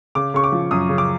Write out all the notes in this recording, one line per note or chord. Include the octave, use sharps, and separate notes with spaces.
C#3 D6
C#3 C#6
D6
F3
F#2 D#6
C#3
D6